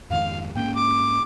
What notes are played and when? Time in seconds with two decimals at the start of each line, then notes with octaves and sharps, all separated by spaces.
0.10 F2 G#2 D#3 F5
0.55 G#2 A#3 C#4 G5
0.75 D6